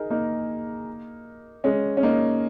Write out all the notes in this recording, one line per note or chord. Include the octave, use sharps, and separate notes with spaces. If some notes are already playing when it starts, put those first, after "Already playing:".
Already playing: D#4 G#4 A#4
A#3 D#4
G#3 C#4
C#4
A#3 D#4